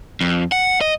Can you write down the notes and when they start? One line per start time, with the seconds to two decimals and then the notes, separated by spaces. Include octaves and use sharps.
0.21 F2
0.52 F#5
0.81 D#5